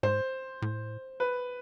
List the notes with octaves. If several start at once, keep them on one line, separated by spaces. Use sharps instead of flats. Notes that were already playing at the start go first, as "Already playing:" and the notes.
G#2 C5
A2
B4